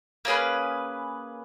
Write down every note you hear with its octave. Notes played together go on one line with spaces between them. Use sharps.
A#3 C#4 G#4 B4